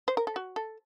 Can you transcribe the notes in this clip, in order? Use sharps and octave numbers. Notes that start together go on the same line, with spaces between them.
C5
A#4
A4
F#4
A4